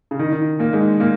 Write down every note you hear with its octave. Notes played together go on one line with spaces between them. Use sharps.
C#3
D#3
D#3
A#2 A#3
G#2 G#3
A#2 A#3